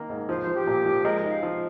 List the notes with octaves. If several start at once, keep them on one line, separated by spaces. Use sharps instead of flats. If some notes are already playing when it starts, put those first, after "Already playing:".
Already playing: D#3 A#3
G#2
F3 C5
C5
F3
G4
A#2
F3
G#3 A#4
D#5
D#4
F5
F3